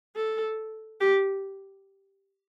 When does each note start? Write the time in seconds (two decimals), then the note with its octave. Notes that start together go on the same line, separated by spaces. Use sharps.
0.15 A4
1.01 G4